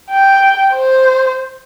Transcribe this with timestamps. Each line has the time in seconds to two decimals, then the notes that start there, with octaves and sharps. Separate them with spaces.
0.11 G5
0.73 C5